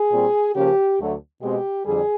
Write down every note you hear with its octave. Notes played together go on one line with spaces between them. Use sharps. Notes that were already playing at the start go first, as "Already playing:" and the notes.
Already playing: G#4
A#2 G3 C4
C#3 F3 A#3 C#4 G4
D2 D3 F#3 A3
B2 G#3 C4 G4
F2 D3 G3 G#4